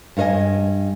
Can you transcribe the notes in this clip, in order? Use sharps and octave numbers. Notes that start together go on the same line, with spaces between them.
G2 E4 A#4 D#5 G#5